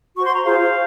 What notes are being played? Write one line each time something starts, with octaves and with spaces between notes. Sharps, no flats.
F#4 C5 C#6
C6
A#5
F4 G#4 C5 F5